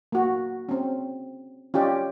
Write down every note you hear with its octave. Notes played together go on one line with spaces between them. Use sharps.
A#3 F#4
C4 C#4
C#4 F4 G4 D5 D#5